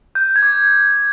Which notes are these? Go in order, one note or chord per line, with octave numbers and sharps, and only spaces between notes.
F#6 G6
G#6
D6